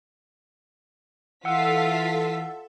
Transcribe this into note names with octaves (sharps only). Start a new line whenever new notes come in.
E3 F4 A4 E5 F#5 E6 B6